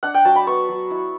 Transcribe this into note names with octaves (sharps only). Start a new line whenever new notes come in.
D4 F#5
G5
F#3 A5
B5
B3 C#6
F#3
E4